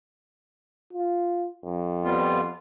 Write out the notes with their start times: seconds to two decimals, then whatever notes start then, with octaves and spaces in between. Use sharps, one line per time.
0.93 F4
1.65 F2
2.04 G3 B3 F4